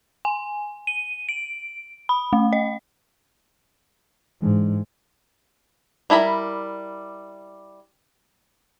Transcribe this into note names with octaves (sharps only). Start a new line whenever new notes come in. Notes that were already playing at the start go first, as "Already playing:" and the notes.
G#5
D#7
D7
B5
A3
D#5
G#2 E3 G#3 D4
G3 E4 A#4 B5